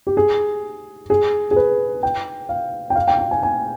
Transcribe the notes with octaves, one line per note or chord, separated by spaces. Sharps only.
G4
G#4
G#4
G#4
B4
G5
F5
G5
F5
G5
G5
G#5
G#5